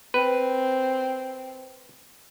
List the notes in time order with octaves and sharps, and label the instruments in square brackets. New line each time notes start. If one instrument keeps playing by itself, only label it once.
[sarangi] C4 [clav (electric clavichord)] B4